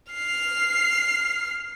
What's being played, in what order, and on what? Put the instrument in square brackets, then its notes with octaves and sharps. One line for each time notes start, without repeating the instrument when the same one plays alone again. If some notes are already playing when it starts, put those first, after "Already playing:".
[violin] F6 C7